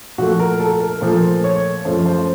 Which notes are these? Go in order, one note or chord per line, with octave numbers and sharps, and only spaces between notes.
A#2 F3 A3 F#4
A#4
A4
A#4
A#2 F3 A3 C5
C#5
F#2 F3 A3 C5
C5